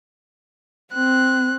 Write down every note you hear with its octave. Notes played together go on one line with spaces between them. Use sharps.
C4 F#6